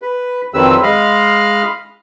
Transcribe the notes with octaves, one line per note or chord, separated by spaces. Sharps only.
B4
F2 D#3 F#3 C4 B4 E6
G#3 D#5 F5 B5 F6